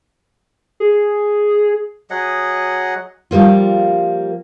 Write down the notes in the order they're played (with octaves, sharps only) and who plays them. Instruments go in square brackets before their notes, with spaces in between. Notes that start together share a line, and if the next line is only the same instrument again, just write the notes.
[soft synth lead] G#4
[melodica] F#3 G#4 D#5 F#5
[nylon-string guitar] F3 G3 A#3 F4